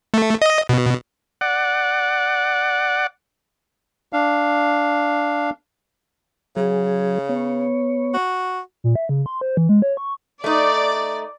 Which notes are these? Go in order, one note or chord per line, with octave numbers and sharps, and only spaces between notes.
A3
D#5
B2
D5 F#5
D4 F5
C#3 F#3 G#4
B3 C#5
F#4
A#2
E5
C#3
C6
C5
E3
G#3
C#5
C#6
A3 D#4 D5